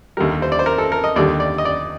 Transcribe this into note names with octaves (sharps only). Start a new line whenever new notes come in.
D#2 D3 G3 A#4
C5
D5
C5
A#4
A4
A#4
D#5
D#2 D3 G3 D5
D5
D#5
D5